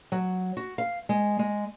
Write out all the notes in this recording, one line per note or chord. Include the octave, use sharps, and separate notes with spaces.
F#3
F#4
F5
G#3
G#3